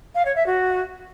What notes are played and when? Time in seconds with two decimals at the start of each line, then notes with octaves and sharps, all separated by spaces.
0.15 F5
0.25 C#5
0.36 E5
0.46 F#4